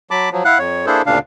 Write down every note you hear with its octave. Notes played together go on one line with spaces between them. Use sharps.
F#3 A5 B5 D6
F3 F#3
E4 F5 F#5 F#6
F2 C#5
A#3 D4 E4 G#4 A4 C5
D2 A#2 C#3 D4 F5